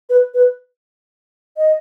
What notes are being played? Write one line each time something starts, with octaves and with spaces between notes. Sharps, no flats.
B4
B4
D#5